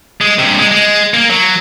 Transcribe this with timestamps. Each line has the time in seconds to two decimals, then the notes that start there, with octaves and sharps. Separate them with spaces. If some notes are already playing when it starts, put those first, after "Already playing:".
0.21 G#3
0.39 G2 C3
0.59 G#3
0.71 G#3
1.14 A#3
1.30 F#3